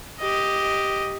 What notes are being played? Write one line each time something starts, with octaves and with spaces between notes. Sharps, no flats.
G4 D#5